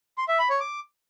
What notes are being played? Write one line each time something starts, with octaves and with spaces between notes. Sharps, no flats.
C6
E5
B5
C#5
D6